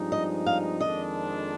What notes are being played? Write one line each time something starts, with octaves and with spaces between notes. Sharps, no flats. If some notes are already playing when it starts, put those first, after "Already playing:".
Already playing: G2 F3 G#3 C4 D#4
D#5
F5
F2 D#3 G#3 D4 D#5